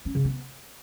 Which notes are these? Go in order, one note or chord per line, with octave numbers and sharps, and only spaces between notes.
C#4
C#3
B3